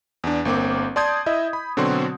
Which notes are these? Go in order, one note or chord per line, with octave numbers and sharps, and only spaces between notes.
E2 D4
G1 A#3 C4 D6
D5 A5 C6 D#6 G6 G#6
E4 D#5 E5
B5
B2 D3 F#3 C4 F#4 C6